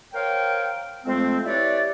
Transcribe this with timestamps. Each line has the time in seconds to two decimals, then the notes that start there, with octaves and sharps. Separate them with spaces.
0.13 A#4 C5 C#5 F5 G5
1.05 F2 G#3 A3 C4
1.46 E4 G4 B4 C#5 D5